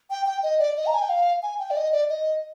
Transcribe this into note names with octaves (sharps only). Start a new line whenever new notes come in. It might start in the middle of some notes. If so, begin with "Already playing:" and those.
G5
G5
D#5
D5
D#5
A#5
G#5
G5
F5
G#5
G5
D5
D#5
D5
D#5